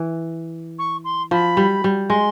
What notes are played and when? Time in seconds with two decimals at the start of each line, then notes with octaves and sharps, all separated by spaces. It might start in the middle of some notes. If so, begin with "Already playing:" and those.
Already playing: E3
0.79 C#6
1.05 C6
1.31 F3 B5
1.57 G3
1.84 G3
2.09 G#3 C6